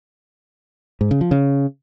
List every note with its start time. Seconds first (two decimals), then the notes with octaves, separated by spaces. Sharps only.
1.01 G#2
1.11 C#3
1.21 F3
1.31 C#3